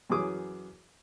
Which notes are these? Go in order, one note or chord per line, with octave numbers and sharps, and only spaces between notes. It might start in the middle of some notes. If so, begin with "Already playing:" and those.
F#2 E3 F#3 G#4 D6 D#6